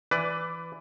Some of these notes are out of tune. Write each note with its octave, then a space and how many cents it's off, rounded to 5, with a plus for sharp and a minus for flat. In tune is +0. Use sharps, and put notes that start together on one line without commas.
E3 +10 B4 +20 D5 +0